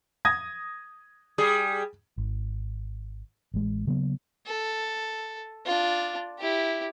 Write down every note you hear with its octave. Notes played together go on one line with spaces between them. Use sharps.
D#6 G#6 A#6
G3 G#4
G#1
A1 G#3
C#3 F#3 A#3 B3
A4
D4 F4
E4 G4